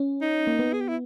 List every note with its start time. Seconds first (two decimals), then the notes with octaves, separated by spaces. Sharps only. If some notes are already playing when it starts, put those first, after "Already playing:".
Already playing: C#4
0.21 D#4
0.47 A#3
0.59 B3
0.73 G#4
0.80 G4
0.88 E4